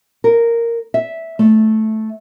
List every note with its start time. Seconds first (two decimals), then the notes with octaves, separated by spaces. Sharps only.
0.24 A#4
0.94 E5
1.39 A3